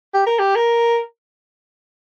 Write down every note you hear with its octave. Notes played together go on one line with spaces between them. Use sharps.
G4
A#4
G4
A#4